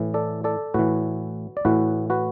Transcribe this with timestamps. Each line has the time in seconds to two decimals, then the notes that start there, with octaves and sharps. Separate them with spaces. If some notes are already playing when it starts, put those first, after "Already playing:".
Already playing: A2 E3
0.14 A4 D5
0.44 A4 D5
0.74 A2 E3 F#4 B4
1.57 D5
1.65 A2 E3 F#4 B4
2.10 F#4 B4